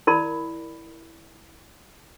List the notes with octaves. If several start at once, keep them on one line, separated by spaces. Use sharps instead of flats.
E4 A#4 D5 B5